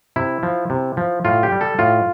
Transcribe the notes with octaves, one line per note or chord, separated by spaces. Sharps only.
C3 E4
F3
C3
F3
A2 F4
G4
G3
A4
A2 F4